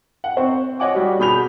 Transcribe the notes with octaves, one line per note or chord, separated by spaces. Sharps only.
F#5
C4 C5 C#6
C#5 D#5 F#5 G#5 D6
G3 F#4
B2 G#4 B5 G6 F7